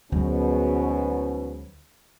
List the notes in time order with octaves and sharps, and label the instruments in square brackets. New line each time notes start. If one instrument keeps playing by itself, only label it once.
[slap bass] D2 F#3 G3 [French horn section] G#2 B2 C#4